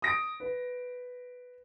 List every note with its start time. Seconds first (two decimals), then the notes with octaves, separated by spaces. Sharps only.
0.02 D#6 A#6 D7
0.40 B4